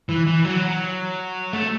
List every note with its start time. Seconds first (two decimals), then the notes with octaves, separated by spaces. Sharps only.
0.09 E3
0.26 E3
0.45 F#3
1.53 A3